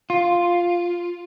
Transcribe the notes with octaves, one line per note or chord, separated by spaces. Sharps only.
F4